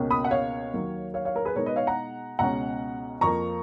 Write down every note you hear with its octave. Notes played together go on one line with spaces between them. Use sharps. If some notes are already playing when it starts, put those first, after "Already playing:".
Already playing: C#2 B2 A#3 C#4
B5 D#6
F#5
C#5 F5
D#2 D#3 F#3 A#3
C#5 F5
C#5 F5
A#4 C#5
G#4 B4
B2 G#3 D#4 A#4 C#5
B4 D#5
C#5 F5
F#5 A#5
C#2 B2 G#3 C#4 F#5 A#5
F2 F3 A#3 A#5 C#6